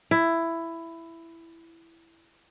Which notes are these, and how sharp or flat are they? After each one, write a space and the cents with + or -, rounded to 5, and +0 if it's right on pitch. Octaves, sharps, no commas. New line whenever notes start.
E4 +10